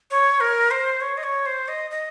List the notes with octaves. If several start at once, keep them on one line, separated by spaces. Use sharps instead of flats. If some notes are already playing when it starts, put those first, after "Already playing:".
C#5
A#4
C5
C#5
D#5
C#5
C5
D#5
D#5